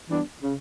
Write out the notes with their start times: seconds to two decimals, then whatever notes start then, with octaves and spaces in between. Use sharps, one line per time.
0.10 E3 G3 B3 D4
0.42 C#3